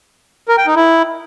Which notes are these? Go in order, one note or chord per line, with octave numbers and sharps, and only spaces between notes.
A#4
G5
D#4
E4